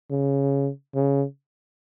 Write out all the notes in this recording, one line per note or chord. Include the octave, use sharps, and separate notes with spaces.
C#3
C#3